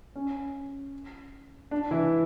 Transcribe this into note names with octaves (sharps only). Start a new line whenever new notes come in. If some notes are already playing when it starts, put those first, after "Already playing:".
C#4
D4
E3 E4